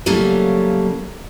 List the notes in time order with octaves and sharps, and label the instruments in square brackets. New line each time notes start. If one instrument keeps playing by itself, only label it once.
[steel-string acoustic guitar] C#3 F#3 G3 A3 A#3